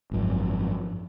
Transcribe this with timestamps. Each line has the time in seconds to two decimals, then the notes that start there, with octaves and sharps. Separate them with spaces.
0.11 G#1 F#2 F3